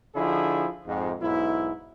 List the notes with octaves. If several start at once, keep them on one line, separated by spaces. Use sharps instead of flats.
D3 F3 D#4 E4 G#4
F2 G#2
B1 G#2 E4